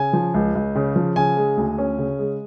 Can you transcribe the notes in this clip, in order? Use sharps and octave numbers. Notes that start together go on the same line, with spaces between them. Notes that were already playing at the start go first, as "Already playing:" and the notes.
Already playing: C#3 G#5
F3
C#2
C#2
C#3
F3
C#3 G#5
G#3
D2
C#4
C#3
G#3